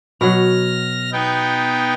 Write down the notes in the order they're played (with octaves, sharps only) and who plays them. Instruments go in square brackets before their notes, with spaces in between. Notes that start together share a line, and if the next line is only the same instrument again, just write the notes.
[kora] B2 F#3 [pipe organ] F6 A#6
[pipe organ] B3 D#4 G5